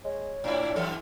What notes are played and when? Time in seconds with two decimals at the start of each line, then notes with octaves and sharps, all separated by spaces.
0.04 G#3 C#5
0.44 A2 D4 E4
0.76 F#2 E3 A4